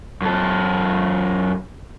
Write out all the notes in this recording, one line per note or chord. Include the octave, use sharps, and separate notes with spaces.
F#2 A4